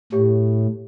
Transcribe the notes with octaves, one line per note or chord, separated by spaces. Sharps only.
A2 G4 C#5 E5 G5 C#6